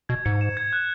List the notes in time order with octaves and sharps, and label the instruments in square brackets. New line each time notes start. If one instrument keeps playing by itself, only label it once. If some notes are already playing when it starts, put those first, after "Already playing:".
[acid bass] B2 [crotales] G#6
[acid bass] G#2 [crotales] C#7
[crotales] E7
G#6
F#6